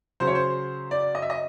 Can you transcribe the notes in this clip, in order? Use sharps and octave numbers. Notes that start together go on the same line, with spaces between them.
C#3 F#3 C5
C#5
C5
D5
D#5
E5
D#5